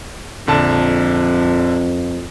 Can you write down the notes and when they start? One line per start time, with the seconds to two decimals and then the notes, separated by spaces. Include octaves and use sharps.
0.47 A#1 F2 D3 A5